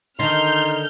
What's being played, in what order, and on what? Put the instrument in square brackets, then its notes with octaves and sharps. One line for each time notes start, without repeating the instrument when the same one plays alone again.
[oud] D3 D#3 [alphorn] D#4 [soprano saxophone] C6 [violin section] F6 G6